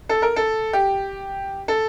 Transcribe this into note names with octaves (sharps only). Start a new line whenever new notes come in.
A4
A#4
A4
G4
A4